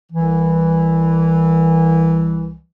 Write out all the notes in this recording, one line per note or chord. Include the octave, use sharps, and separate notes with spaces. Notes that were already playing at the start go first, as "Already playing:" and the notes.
C2 E3